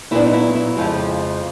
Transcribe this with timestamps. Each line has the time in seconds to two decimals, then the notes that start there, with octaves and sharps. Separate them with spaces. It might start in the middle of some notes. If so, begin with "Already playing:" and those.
0.11 A#2 F#3 B3 D4 E4
0.26 D#4
0.33 E4
0.55 E4
0.77 F2 C#3 F3 G#3